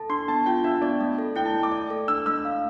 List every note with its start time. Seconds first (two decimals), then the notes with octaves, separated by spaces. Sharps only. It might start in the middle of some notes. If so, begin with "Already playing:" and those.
Already playing: A4 A5
0.10 D4 C6
0.28 B3 A5
0.46 F4 G5
0.64 D4 E5
0.82 B3 D5
1.01 A3
1.19 A4
1.36 E4 G5
1.45 A5
1.54 A3
1.63 D6
1.72 D5
1.90 A4
2.08 D4 E6
2.26 A3 E6
2.45 F5